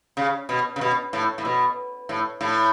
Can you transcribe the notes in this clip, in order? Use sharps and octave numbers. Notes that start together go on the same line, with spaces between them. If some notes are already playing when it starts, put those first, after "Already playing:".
C#3
B2
C#3
B2
A2
A2
B2
A2
A2